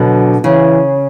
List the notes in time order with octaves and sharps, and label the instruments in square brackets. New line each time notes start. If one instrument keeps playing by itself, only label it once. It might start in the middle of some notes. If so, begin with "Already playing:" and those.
Already playing: [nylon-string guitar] B2 D3 [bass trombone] F#3
[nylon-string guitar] C#3 [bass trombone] E3